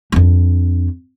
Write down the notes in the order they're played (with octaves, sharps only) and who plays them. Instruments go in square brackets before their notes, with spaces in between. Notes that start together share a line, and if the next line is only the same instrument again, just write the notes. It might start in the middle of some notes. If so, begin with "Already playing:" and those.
[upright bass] F2 D4